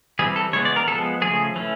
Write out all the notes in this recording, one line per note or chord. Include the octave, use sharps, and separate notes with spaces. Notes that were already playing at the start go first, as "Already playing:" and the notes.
E3 G3 C4 G#4
A4
C#3 E3 G#3 B3 C#5
D5
A#4
F3 G#3 B3 A4
C#3 F3 A3 G#4
E3 A3 C#4